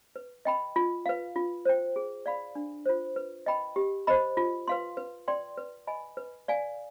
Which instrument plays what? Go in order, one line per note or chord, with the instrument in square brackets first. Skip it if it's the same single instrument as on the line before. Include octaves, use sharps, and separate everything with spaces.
[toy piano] B4
D#5 G5 B5
F4
B4 F5
F4
C5 G5
G#4
D5 F5 B5
D4
F4 C5
B4
D#5 G5 B5
G4
C5 D#5 B5
F4
B4 F5 C6
B4
D5 G5 C6
B4
D#5 G#5 B5
B4
D5 F5 G#5